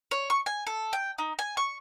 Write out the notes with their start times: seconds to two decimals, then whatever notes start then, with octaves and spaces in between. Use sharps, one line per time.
0.11 C#5
0.30 C#6
0.46 G#5
0.67 A4
0.93 G5
1.18 D#4
1.39 G#5
1.57 C#6